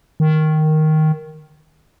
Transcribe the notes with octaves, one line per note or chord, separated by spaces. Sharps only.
D#3